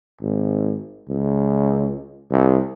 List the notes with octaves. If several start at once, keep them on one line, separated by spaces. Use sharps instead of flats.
G#1
C#2
C2